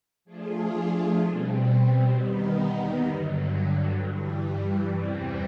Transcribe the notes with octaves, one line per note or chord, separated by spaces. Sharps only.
F3 A3 D4 F4 G#4
B2 G3 C4
D#2 D#3 G3 B3 D#4
G2 D3 F#3
G2 E3 G3
E2 C3 E3 G3 C4